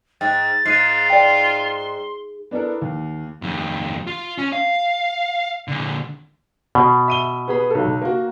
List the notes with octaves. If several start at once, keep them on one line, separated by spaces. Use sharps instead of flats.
G#2 G5 A6
G#2 F4 C7 D#7
D5 G5 C6
B3 D4 E4 A4 A#4
D#2
F2 D#3
F4
C#4
F5
A#2 D3
B2
E5 D#7 G7
B3 G#4 B5
B1 A4
A#3 F#4